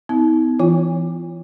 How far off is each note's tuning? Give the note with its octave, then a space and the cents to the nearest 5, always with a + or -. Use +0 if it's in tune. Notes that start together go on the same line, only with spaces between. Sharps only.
B3 +35 D#4 +45
E3 +30 F4 -25 G#5 -45